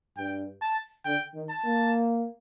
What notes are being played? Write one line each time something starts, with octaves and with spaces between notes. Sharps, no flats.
G2 G5
A5
D3 G5
D#3
A5
A#3